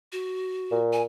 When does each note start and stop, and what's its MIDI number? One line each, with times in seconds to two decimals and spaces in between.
0.12 0.79 66
0.71 1.04 46
0.93 1.03 80